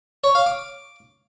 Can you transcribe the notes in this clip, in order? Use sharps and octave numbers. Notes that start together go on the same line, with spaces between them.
C#5
F5
D6